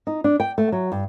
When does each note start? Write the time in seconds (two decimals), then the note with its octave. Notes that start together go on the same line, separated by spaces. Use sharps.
0.07 D#4
0.24 D4
0.40 G5
0.58 A3
0.72 F#3
0.92 G2